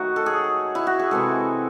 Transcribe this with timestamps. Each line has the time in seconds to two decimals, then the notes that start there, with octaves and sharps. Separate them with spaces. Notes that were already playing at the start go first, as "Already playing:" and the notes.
Already playing: D#3 F#3 A3 D#4 F#4
0.16 A4
0.26 G#4
0.75 E4
0.87 F#4
0.99 G#4
1.11 C3 E3 G#3 A4